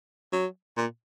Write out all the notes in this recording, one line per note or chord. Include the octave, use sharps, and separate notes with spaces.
F#3
A#2